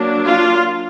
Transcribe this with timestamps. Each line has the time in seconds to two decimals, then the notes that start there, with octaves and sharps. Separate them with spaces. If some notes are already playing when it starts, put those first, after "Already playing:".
Already playing: F#3 A#3 D4
0.26 F4